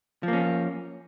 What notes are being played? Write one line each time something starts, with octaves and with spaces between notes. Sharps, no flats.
F3 A#3 C#4